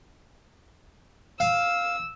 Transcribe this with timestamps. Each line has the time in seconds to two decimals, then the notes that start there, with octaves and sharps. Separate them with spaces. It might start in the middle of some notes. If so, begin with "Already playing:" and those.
1.40 F5 E6